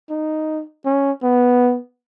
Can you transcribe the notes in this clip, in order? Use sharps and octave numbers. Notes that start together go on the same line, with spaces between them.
D#4
C#4
B3